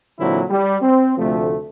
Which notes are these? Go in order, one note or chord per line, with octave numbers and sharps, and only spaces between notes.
A#2 D3 E3 F#3 C4 E4
G3
C4
D2 C3 F3 A3